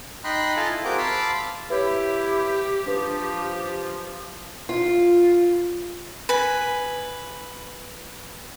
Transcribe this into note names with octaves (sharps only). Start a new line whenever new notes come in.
D#4 D#5 G5 B5 C6 F#6
F4 A4 D#5 F5 G#5 A5
E4
C4 F#4 G#4 A#4 D6 G6
F5 A5 B5 C6 D6 E6
E4 G4 B4 C#5
F3 D4 B4
F4
B4 G#5